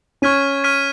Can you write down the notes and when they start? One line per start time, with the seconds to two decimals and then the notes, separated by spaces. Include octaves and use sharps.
0.22 C#4 C#6 F6 G#6 B6 D#7
0.64 C#6 F6 G#6 B6 D#7